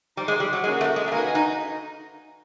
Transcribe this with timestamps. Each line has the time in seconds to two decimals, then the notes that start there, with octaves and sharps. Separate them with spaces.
0.16 G3 D#4 G4 C5
0.28 G#3
0.40 G3
0.53 F#3
0.64 G#3 A#3 C#4 F#4 A#4
0.81 A3
0.96 G#3
1.08 A3
1.12 A#3 D#4 F#4 B4 D#5 G#5
1.35 D#4